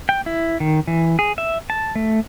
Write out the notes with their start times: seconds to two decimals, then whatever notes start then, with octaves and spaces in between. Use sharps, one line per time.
0.09 G5
0.26 E4
0.60 D#3
0.87 E3
1.19 G#4
1.38 E5
1.70 A5
1.96 A3